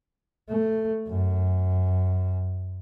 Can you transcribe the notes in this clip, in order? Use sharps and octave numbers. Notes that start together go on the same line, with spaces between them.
A3
F#2